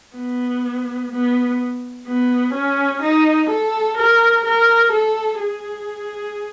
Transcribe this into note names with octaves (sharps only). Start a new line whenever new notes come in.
B3
B3
B3
C#4
D#4
A4
A#4
A#4
A4
G#4